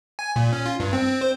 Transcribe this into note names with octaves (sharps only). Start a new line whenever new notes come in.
G#5
A#2
C#4
F4
G2
C4
C4
C5